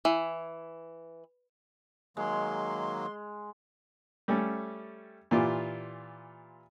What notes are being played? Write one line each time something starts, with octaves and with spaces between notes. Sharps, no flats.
E3
D#3 F#3 G#3 A#3 C6
G3 A3 C#4
A#2 E3 F4 G4